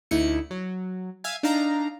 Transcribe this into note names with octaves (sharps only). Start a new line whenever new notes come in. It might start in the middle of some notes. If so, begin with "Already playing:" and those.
D2 D#4 E4 C#7
F#3
E5 F5 G#5
D4 D#4 F5 A#5